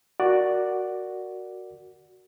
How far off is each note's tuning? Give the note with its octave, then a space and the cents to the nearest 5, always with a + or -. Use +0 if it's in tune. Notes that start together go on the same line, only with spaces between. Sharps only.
F#4 +0 A#4 +0 D5 +0